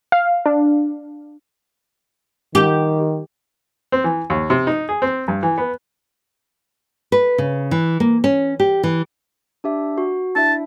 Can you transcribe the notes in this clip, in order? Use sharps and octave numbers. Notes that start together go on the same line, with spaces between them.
F5
D4
D#3 G4
C4
E3
D#2
C3
D#4
G#4
C4
G2
E3
B3
B4
C#3
E3
A#3
C#4
G4
E3
D4 G4 E5
F#4
D4 E4 E5 A5